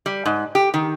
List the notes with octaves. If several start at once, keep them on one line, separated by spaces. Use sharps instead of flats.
G3
G#2
G4
D#3